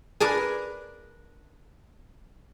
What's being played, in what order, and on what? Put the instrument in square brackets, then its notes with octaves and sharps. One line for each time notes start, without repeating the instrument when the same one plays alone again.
[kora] D4 A#4 B4 [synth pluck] G#4 A5 D6